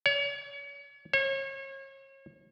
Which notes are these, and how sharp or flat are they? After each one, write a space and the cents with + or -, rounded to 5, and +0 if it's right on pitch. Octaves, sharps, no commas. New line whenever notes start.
C#5 +35
C#5 -35